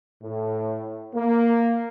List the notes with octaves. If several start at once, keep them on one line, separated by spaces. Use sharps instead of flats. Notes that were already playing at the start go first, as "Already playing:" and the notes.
A2
A#3